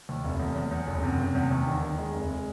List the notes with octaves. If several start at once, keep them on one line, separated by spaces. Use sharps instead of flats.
D#2
F1
E2
E2
E2
F#1
C3
C3
E2
D#2
D#3
D#3
G#3
F1
G#3